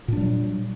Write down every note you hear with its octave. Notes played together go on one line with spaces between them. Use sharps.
A#2 F#3 G3 D4